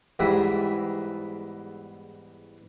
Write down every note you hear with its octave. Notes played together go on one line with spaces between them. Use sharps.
E2 G#2 G3 E5